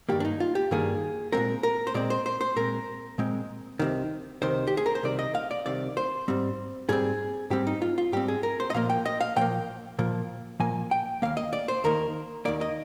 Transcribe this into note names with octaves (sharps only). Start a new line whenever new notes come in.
G2 D#3 G3 A#3 G4
D4
D#4
F4
G4
G2 D#3 G3 A#3 G#4
A#2 G#3 C4 A#4
A#4
C5
A#2 G#3 C4 D5
C5
C5
C5
A#2 G#3 C4 A#4
A#2 G#3 C4
C2 C3 D#3
C2 C3 D#3 C5
G4
G#4
A#4
C5
C2 C3 D#3 D5
D#5
F5
D5
C2 C3 D#3 D5
C5
G#2 G3 C4
G#2 G3 C4 G#4
G#2 G3 C4 G4
D#4
F4
F4
G#2 G3 C4 G4
G#4
A#4
C5
D#5
A#2 F3 A#3 F5
G5
D#5
F5
A#2 F3 A#3 G5
A#2 F3 A#3
A#2 F3 A#3 G#5
G5
D#2 D#3 A#3 F5
D#5
D5
C5
D#2 D#3 A#3 A#4
D#2 D#3 A#3 D5
D#5